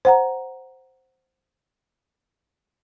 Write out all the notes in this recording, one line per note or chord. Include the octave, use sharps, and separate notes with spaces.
C5 F#5 A#5